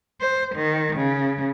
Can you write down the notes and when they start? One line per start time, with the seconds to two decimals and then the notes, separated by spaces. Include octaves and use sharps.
0.21 C5
0.55 D#3
0.96 C#3